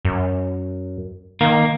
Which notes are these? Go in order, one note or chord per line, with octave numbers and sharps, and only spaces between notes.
F#2
D#3 A#3